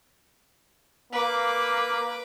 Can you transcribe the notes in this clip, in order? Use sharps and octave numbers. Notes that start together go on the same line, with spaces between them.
A#3 B4 D6